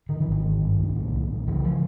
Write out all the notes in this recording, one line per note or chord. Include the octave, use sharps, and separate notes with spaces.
D3 D#3
E3
G#1 D#3
G#1
G2
C2
A#2
C2
A#2
C#3 E3
F3